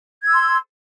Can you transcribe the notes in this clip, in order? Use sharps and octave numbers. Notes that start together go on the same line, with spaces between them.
C6 E6 G#6